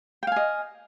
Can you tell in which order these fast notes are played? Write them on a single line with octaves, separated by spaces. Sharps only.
G5 F5 G#5 D#5